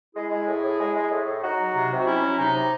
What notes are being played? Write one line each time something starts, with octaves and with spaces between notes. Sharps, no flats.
G#3 E4 G#4
G#3
A2
A2
G#3
G#3
A2
A2
F#3 D#4 F#4
F#3
C3
C3
F#4
F#3 C#4 E4
F#3
C3 D#4
C3